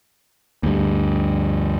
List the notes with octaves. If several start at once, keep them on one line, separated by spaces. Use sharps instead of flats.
D2 G2